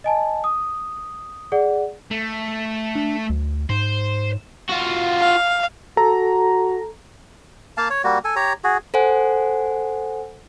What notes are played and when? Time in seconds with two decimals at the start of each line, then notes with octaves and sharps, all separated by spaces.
0.04 D#5 G#5 A5
0.44 D#6
1.52 G#4 D5 F#5
2.11 A3
2.95 D4
3.29 D2
3.70 G#2 C5
4.69 F4 F#4
5.20 F5
5.97 F#4 A4 A#5
7.77 A#3 F5 A5
7.90 C#5
8.04 G3 A#3 F#4
8.24 A4 G#5
8.36 G4 C#5 A#5
8.64 F#4 G#4
8.94 A4 C5 F#5 G#5